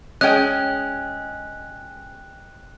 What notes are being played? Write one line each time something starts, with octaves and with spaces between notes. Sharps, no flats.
G#3 C#4 D#5 G5 F#6